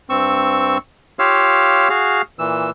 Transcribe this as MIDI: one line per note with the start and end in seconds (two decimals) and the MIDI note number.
0.10 0.78 43
0.10 0.78 60
0.10 0.78 85
0.10 0.78 88
1.19 1.89 65
1.19 1.89 67
1.19 1.89 73
1.19 1.89 77
1.19 1.89 88
1.19 1.89 89
1.89 2.22 66
1.89 2.22 68
1.89 2.22 77
1.89 2.22 89
2.39 2.70 46
2.39 2.70 52
2.39 2.70 88